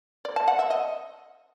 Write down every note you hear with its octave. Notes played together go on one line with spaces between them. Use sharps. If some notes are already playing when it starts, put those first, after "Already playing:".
D5
A5
F#5
E5
D#5